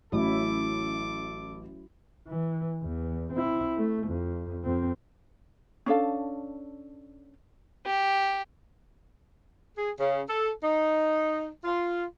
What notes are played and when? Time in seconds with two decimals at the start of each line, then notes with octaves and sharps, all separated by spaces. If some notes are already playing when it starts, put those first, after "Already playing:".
0.12 A1 F#3 C#4 E4 A4 D6
2.27 E3
2.83 E2
3.33 C4 E4
3.77 A3
4.07 F2
4.63 F2 C4
5.86 C#4 D4 A4 F5
7.86 G4
9.76 G#4
9.98 C#3
10.28 A4
10.62 D#4
11.64 F4